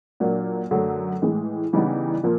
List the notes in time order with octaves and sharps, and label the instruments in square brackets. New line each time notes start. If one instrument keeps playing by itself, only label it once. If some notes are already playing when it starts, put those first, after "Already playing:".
[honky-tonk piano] A#2 F#3 A#3 D4
F#2 D3 F#3 A3
A2 E3 G#3
C#3 E3 G3 B3 D#4
A#2 F3 A#3